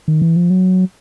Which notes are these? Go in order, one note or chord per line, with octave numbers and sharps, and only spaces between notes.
D#3
E3
F3
F#3